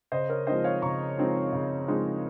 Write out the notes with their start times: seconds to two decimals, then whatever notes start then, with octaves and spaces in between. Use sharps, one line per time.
0.12 C#3 C5 D#5
0.29 A#4 C#5
0.47 F3 G#3 C4 D#4 C5 D#5
0.64 C#5 F5
0.82 C#3 A#5 C#6
1.18 F3 G#3 C4 D#4
1.53 C#3
1.88 F3 G#3 C4 D#4